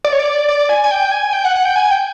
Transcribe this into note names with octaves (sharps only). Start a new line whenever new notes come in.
D5
C#5
D5
D5
G#5
G#5
G5
G#5
G5
F#5
F#5
G5
G#5
G5